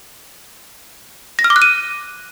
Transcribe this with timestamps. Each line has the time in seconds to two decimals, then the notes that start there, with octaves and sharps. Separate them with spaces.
1.39 A#6
1.44 F6
1.50 D6
1.56 F#6
1.62 D#7